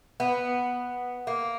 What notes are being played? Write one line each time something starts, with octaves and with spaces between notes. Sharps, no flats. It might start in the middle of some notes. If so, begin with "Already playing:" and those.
B3
A#3